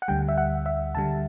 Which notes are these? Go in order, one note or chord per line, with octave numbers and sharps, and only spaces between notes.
F#5
D2 D3 G3 G5
E5
F#5
E5
D2 D3 G3 A5